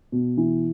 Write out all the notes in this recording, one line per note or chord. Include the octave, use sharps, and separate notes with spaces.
B2
E3